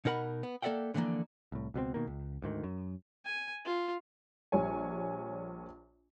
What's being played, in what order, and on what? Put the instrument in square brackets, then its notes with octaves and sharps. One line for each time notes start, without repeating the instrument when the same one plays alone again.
[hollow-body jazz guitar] B2 D#4 A#4 F#5 B5
B3
A#3 A4 D5 E5 F#5 G5
D3 E3 F3 G#3 A#3
[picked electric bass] C2 A2
C#2 B2 F3 C4
B2 D#3 A#3
C#2
D2 G#2 D#3
F#2
[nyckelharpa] G#5
F4
[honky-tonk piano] A#1 G3 C#5 G#5